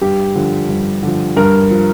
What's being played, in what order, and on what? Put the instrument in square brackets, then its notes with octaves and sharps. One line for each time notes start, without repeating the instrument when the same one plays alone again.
[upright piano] G2 G4
D3 F3
G2
D3 F3
G2 A#4
F3